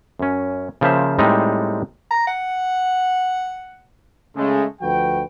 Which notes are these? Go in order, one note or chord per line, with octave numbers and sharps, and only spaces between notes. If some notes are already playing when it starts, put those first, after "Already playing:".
F#2 C#4
C#3 F3 A#3 C5 E5
A2 G3 G#3 C4 D#4
A#5
F#5
C#3 G#3 A3
D2 F3 F#4 B4 G5